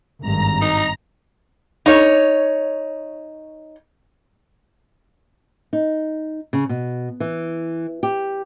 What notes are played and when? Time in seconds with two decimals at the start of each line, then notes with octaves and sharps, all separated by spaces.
0.21 G#1 G2 A#5
0.61 D#4
1.86 D#4 C#5
5.73 D#4
6.53 C#3
6.69 B2
7.20 E3
8.03 G4